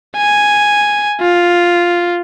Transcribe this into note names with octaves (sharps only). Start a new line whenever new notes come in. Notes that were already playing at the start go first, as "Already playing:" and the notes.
G#5
F4